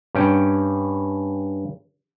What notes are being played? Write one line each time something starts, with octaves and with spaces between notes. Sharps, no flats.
G2 C#4 G5